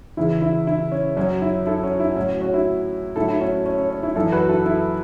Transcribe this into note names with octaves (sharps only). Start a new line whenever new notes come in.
E2 C#3 E3 E4
E4
E4
C#4
F#2 F#3 C#4
E4
E4 A4
C#4 F#4
E4
A2 F#3 C#4
C#4 F#4
E4
A2 F#3 E4 A4
E4
C#4 F#4
C#4
C#4
C#4
E4
F#2 E3 E4 A4
F#4 B4
E4 A4
E4 A4